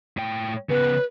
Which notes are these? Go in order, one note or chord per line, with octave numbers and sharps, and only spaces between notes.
A2 G5
C#3 B3 B4